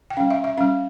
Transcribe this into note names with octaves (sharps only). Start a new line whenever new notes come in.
G5
G3 C#4 F5
E5
E5
G3 C#4 F5